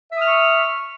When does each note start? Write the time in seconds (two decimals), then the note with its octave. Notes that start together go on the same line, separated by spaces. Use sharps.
0.12 E5
0.16 D#6
0.21 F6
0.25 C#6